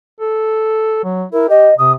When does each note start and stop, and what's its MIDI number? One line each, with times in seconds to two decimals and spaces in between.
0.21 1.02 69
1.04 1.25 54
1.32 1.48 64
1.32 1.46 70
1.49 1.70 67
1.49 1.74 75
1.78 1.94 48
1.78 1.91 87